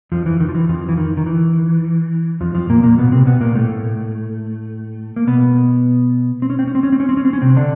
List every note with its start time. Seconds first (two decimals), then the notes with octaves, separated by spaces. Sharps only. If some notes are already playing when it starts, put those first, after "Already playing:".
0.12 F2 F3
0.26 E3
0.40 D#3
0.49 F3
0.55 E3
0.69 F2 F3
0.89 E3
0.97 D#3
1.17 D#3
1.26 E3
2.41 F2 F3
2.55 F2 F3
2.70 A#2 A#3
2.83 A#2 A#3
2.98 B2 B3
3.12 C3 C4
3.26 B2 B3
3.41 A#2 A#3
3.56 A2 A3
5.16 A#3
5.27 B2 B3
6.42 C4
6.50 C#4
6.59 C4
6.67 C#4
6.75 C4
6.83 C#4
6.92 C4
7.00 C#4
7.09 C4
7.17 C#4
7.25 C4
7.33 C#4
7.42 C3 C4
7.57 D3 D4